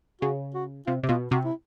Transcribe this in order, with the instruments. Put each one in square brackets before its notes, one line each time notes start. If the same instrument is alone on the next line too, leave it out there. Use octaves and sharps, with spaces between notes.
[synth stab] C#3 [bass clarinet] F#4
[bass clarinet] F#4
[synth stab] C3 [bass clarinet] F4
[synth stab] C3
[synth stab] B2 [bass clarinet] F4
[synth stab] C3 [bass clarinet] F#4
[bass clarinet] E4